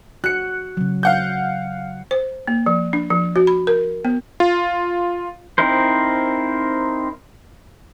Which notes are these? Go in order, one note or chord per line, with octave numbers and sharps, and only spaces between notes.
F#4 F#6 C#7
C#3 F#3
F5 F#5 G6
C5
A#3
F3
D4
F3
F#4
B5
A#4
B3
F4
C4 D#4 E4 A#4 C5